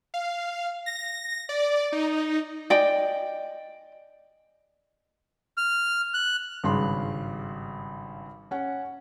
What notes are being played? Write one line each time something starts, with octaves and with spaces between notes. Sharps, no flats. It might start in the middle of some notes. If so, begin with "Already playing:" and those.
F5
A#6
A#6
D5
D#4
D5 D#5 G5 G#5
F6
F#6
G#1 G2 C#3 C6
C#4 F#5